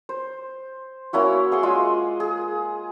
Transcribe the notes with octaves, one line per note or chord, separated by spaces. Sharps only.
C5
A#3 C#4 E4 F#4
G#4 F#5 C6
G#3 F4 G#5
G#4